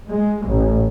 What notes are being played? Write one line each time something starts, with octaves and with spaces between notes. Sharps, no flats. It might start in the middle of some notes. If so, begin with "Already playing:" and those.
G#3
A1